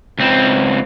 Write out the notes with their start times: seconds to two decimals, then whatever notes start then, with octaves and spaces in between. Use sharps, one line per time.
0.19 C#2 C4